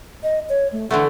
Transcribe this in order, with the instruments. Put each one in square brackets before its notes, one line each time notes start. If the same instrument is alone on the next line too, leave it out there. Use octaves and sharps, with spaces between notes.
[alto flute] D#5
C#5
A3
[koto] D3 E3 A3 [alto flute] F#5